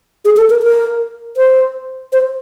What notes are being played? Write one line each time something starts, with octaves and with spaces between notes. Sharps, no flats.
G#4
A4
A#4
A#4
C5
C5